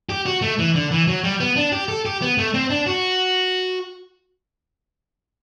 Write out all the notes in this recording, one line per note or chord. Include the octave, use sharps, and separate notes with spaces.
G4
F#4
A3
E3
D3
E3
F#3
G3
B3
D4
G4
A4
G4
B3
A3
C4
D4
F#4